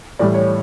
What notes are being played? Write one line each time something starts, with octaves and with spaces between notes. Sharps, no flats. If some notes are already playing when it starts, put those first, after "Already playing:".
A2 E3 G3 D5
C#5